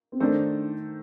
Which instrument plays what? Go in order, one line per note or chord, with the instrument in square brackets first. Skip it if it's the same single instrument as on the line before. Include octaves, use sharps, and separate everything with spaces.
[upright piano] C4
[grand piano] D#3 A3 D#4 A4 C5 [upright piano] D4